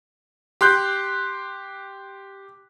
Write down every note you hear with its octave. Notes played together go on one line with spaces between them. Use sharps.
G4 C6 F#6 G6